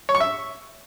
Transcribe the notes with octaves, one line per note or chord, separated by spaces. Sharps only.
C#5
C#6
E5